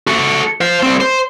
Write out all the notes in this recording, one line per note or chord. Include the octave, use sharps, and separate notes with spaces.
F#4 A4
C5 F5
G3 C4
C5